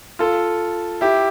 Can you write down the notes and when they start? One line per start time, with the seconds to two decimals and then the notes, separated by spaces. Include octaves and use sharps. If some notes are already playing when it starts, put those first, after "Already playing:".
0.19 F4 A4
1.01 E4 G4